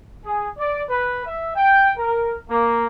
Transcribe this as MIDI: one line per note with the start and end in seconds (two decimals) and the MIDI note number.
0.24 0.47 68
0.58 0.81 74
0.89 1.21 71
1.25 1.50 76
1.56 1.91 79
1.97 2.34 70
2.49 2.86 58